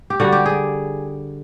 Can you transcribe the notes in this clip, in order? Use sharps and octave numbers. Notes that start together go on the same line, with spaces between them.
G4
D3 G3 F#4
G4
G#4